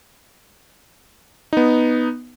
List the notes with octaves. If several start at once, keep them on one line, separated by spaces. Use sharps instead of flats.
B3 D#4